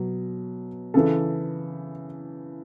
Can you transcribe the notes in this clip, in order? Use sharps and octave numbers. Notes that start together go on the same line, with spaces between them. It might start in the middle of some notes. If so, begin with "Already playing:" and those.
Already playing: B2 F#3
C#3 E3 A4